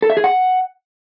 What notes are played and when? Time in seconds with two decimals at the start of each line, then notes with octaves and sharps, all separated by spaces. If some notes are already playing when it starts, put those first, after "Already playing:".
0.02 A4
0.10 E5
0.17 G#4
0.24 F#5